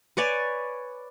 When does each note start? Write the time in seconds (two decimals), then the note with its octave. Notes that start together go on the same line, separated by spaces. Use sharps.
0.17 B4 C#5 D5 G#5